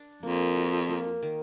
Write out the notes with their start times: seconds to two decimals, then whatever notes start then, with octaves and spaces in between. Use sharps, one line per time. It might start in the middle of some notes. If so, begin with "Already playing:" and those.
Already playing: D4
0.23 F2 A#3
0.56 F#4
0.89 A#3
1.23 D#3